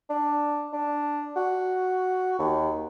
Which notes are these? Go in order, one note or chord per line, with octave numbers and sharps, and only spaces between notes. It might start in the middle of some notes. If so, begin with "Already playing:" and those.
D4
D4
F#4
D#2